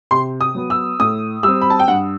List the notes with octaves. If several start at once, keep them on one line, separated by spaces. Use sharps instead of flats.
C3 C6
D#6
F#3 B3
E6
A2 D#6
G3 C4 E6
B5
A5
G5
G2 F#5